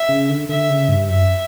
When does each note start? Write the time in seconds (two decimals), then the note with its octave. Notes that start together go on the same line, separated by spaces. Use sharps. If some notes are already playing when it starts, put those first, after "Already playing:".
Already playing: E5
0.09 C#3
0.29 D3
0.49 D3 E5
0.70 C#3
0.89 G2
1.09 F#2 E5